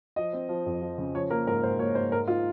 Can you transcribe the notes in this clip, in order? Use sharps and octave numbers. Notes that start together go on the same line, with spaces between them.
F3 D#5
C4
F3
F2
F3
C#3
F3 C#5
A#3 A#4
G#2 A#4
G#2 C5
A#3 C#5
G#2 C5
G#2 A#4
D#4 F4